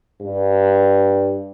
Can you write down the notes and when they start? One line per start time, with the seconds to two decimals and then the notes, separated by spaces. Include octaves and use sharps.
0.21 G2